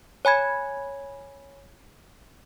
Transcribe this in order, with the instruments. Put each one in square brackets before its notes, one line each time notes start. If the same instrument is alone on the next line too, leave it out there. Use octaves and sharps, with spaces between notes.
[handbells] C#5 G#5 B5 G#6